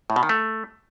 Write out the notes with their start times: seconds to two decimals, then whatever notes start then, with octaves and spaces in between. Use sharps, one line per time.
0.10 A2
0.16 B2
0.23 D#3
0.29 A3